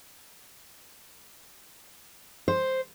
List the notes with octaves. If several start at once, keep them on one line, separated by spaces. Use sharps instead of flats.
C5